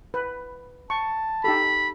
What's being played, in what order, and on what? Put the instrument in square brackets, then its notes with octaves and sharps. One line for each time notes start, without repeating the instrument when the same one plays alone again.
[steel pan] B4
[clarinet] A5 [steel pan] C#6
[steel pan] D#4 G4 A4 [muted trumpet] B5